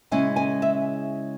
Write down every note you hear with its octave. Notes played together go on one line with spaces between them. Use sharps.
C#3 G#3 C#4 E4 G#5
G#5
E5